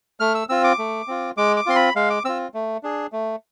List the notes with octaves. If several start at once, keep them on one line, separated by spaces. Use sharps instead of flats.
A3 F6
E6
C4 F4 E6
D6
A3
C4 F4
G#3 D6
D6
C4 F4 C6
B5
G#3 F5
D6
C4 F4 E6
A3
D4 G#4
A3